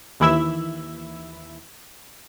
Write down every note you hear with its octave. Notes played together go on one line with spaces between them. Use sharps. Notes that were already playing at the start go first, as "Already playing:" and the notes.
D#2 E3 E4 E5